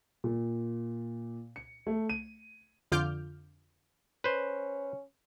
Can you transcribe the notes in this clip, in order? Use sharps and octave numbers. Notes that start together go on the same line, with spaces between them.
A#2
C#7
A3
D#7
F2 D3 F4 D6 F6 G6
C#4 B4 C5